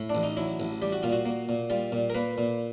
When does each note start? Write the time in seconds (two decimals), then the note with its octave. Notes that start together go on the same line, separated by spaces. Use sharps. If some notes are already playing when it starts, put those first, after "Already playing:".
Already playing: A2
0.10 D4
0.15 A1
0.23 D#4
0.37 F#3 E4
0.60 A1
0.82 G3 G4
0.92 F#4
1.03 A#2 F4
1.12 F#4
1.25 A#3
1.49 A#2
1.70 G3 F4
1.92 A#2
2.10 A#4
2.15 A#3 B4
2.38 A#2